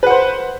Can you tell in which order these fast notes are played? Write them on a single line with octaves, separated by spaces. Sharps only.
B4 F#5 C5